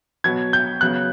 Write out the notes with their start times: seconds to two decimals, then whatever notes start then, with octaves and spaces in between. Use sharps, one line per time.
0.24 B2 F#3 B3 G#6
0.53 G6
0.81 C#3 F#3 B3 F#6